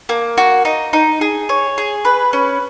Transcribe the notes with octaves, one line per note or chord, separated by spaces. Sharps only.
A#3
F#4
D#4
D#4
G#4
C#5
G#4
B4
C#4